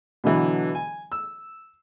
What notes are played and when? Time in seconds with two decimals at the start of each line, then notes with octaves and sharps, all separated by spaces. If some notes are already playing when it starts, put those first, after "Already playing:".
0.24 B2 D3 E3 F#3
0.75 G#5
1.12 E6